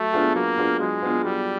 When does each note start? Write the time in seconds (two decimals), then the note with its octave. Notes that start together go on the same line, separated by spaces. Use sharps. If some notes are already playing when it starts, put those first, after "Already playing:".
Already playing: F#3 A3
0.13 B3 D4 F4 G#4
0.35 F#3 A#3
0.58 B3 D4 F4 G#4
0.80 F#3 G#3
1.02 B3 D4 F4 G#4
1.24 F#3 G3